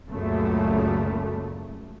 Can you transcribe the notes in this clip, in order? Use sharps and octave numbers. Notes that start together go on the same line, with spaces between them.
C#2 F#2 A#2 C#3 A3